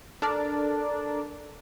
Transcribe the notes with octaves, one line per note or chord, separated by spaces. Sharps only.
D4 A4 A#4 D5